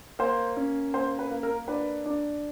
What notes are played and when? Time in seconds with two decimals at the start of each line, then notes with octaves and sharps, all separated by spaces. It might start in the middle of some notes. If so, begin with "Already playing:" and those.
0.19 A#3 C5
0.57 C#4
0.94 A#3 C5
1.19 B4
1.31 A#3
1.43 A#4
1.68 D4 B4
2.06 D4